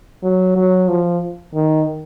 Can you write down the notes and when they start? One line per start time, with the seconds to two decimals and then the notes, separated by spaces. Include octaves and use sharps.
0.23 F#3
0.56 F#3
0.89 F3
1.54 D#3